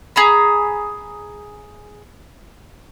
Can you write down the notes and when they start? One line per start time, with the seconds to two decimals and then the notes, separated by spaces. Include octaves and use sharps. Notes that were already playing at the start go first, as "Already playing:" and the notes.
0.16 G#4 A#5 B5